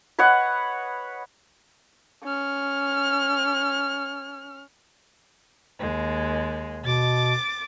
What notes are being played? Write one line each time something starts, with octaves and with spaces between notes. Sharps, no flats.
B4 C#5 D#5 F#5
C#4 F6
D#2 G#3
B2 D6 A6